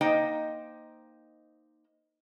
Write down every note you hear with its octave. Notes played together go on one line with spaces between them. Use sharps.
A#3 D#4 C5 D#5 G5